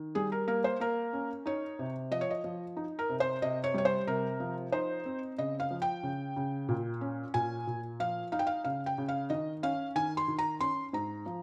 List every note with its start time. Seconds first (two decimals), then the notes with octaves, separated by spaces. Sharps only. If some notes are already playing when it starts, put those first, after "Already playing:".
Already playing: D#3
0.15 G3 G#4
0.32 A#4
0.47 A#3 A#4
0.64 C5
0.80 A#3 A#4
1.13 C#4
1.46 D#4 C#5
1.79 C3
2.11 F3 D#5
2.21 C#5
2.31 D#5
2.44 F3
2.77 D#4
2.99 A#4
3.09 C3
3.20 C5
3.42 C3 D#5
3.64 C#5
3.74 G3 C#5
3.85 C5
4.07 C3 A#4
4.40 F3
4.72 D#4 C5
5.05 C4
5.38 C#3 D#5
5.60 F5
5.71 F3
5.82 G5
6.03 C#3
6.36 C#3
6.69 A#2
7.01 C#4
7.34 A#2 G#5
7.67 A#2
8.00 F3 F5
8.32 D#4 F5
8.39 G5
8.47 F5
8.64 C#3 F5
8.86 G5
8.98 C#3
9.08 F5
9.30 D#3 D#5
9.63 C#4 F5
9.96 D#3 G#5
10.17 C6
10.28 D#3
10.39 A#5
10.60 C#4 C6
10.93 G#2 A#5
11.26 F3